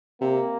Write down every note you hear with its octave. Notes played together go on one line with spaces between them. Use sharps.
C3 A#3